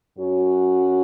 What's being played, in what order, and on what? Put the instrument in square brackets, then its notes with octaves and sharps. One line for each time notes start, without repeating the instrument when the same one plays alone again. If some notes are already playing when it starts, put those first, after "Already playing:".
[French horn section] F#2 F#3 C#4 F#4